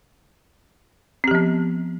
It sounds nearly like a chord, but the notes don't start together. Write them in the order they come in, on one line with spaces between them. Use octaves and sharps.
C4 G4 F3 B3